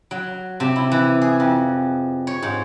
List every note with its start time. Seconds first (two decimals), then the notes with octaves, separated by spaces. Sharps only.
0.11 F#3
0.60 C3
0.76 E4
0.92 E3
1.21 G#4
1.40 F2
2.27 C#5
2.42 G#2